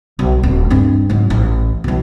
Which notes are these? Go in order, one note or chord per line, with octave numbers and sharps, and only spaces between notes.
B1
D1
G2 C4
G#2 F#3
A1
B1 E3